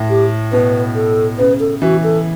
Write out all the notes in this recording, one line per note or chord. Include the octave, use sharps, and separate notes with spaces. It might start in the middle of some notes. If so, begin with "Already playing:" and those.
Already playing: A2
G4
B2 B4
A4
C#3 B4
A4
E3 F#4
A4